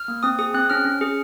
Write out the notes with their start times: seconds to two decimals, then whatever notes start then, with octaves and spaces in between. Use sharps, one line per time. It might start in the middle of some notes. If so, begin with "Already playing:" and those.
Already playing: F6
0.08 A#3
0.23 C4 D#6
0.39 G#4 D#6
0.54 C4 F#6
0.70 C#4 F6
0.85 C#4
1.01 G#4